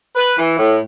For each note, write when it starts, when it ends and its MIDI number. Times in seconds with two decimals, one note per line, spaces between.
0.16 0.35 71
0.38 0.55 52
0.59 0.80 45